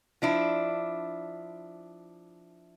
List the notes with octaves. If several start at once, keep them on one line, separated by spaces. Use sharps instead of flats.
F3 D4 E4